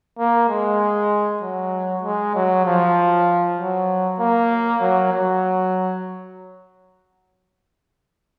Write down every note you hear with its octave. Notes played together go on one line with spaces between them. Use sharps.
A#3
G#3
F#3
G#3
F#3
F3
F#3
A#3
F#3
F#3